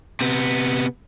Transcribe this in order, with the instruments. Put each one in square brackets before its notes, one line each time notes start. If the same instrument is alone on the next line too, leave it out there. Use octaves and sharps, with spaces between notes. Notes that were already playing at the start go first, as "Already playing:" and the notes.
[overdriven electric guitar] C3 B3